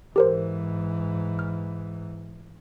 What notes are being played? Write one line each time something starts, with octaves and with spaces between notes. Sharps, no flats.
G#2 E3 G4 A#4 C5
F6